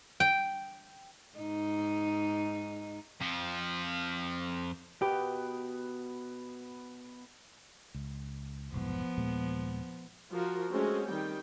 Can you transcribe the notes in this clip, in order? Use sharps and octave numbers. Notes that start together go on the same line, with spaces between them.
G5
G#2 D#4
F2 F3
B2 B3 G4 B4
C#2
F1 B1 G#2 F3 B3
D#1 A#2 G#3
F3 F4 F#4 A#4
G#3 A3 C4 C#4 F#4
D#3 G3 G5